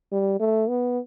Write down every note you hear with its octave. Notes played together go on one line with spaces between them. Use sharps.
G3
A3
B3